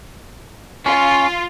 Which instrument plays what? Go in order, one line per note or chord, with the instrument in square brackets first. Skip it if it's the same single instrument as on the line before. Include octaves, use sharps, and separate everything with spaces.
[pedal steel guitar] C#4 [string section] F4